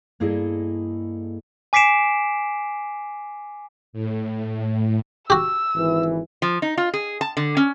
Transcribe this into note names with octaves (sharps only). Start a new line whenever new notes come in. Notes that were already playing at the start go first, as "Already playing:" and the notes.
G2 A#3 E4 G#4 A4 D#5
G#5 D6 B6 C7 D7 E7
A2
F#4 G4 E6
G#1 E3
F3
D#4
F4
G#4
A5
D3
C#4